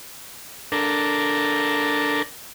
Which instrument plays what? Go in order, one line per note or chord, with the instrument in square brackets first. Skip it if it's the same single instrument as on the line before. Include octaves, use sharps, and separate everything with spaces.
[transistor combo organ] D4 A4 A#4